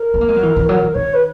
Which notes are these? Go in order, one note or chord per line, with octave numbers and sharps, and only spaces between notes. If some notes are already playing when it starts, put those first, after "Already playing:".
Already playing: A#4
B3
A#3
G#3
F#3
E3
E3
F#3
E3
D#3 C#5
B4